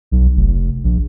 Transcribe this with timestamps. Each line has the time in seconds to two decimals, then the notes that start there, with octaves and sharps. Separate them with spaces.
0.12 B1
0.36 F1
0.84 A#1